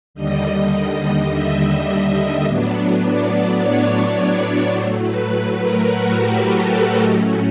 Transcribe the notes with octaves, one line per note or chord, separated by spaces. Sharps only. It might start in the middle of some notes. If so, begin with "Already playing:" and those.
D#2 D3 G3 D#5
E5
D#5
A2 F#3 B3 D4
D5
C#5
C#5
A2 F#3 A3 C5
B4
A#4
F#4
G4
A4
A2 F#3 A3 C#4 D#5